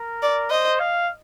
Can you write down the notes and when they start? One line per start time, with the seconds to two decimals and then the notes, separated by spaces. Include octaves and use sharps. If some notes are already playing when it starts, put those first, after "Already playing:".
Already playing: A#4
0.22 D5
0.50 C5 D#5
0.80 F5